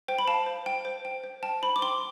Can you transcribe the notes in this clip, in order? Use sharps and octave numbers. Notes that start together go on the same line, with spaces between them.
C5 G5
B5
F5 A5
C5
G5
C5
G5
C5
G5 A5
C5 B5
D6
G5 C6